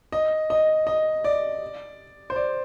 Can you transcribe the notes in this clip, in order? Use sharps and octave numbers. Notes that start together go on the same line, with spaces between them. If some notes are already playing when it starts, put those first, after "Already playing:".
D#5
D#5
D#5
D5
C5
D5